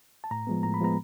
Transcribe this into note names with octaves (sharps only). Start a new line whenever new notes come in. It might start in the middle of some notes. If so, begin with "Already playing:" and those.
A5
A2 A#5
F3 G#3 B3
A2 A#5
B5
F3 G#3 B3 A#5